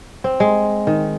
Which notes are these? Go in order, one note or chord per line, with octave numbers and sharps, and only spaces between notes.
C4
G#3
D#3